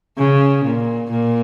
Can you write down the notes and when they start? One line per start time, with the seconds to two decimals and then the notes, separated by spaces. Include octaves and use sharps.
0.18 C#3
0.65 A#2
1.11 A#2